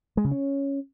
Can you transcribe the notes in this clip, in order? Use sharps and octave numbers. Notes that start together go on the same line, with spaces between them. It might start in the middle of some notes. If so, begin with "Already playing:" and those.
G#3
C#3
C#4